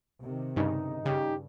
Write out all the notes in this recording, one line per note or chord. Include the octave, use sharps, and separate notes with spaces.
C3 D#3
G2 C#3 D#4
G2 C#3 G4